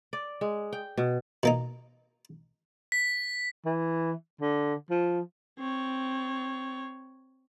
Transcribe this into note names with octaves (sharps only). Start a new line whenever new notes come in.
D5
G#3
G5
B2
B2 A#3 D#4
B6
E3
D3
F3
C4 C#5